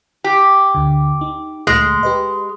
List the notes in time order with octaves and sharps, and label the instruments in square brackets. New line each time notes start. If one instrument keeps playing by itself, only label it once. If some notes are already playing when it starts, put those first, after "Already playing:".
[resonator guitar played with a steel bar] G4
[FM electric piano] D2 D3
D#4
[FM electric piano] D2 A#2 A3 [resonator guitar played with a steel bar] G#3
[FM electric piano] G4 B4 D#5